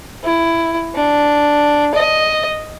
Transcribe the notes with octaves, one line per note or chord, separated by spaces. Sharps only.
E4
D4
D#5